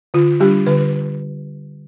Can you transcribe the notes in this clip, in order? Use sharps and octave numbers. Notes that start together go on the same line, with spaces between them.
D3 F4
G3 D4 G4
D3 B4